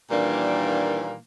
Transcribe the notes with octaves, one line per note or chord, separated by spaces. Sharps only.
A#2 D#3 E3 G3 A#3 D4